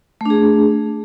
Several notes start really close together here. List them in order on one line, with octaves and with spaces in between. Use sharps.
A3 D4 G#4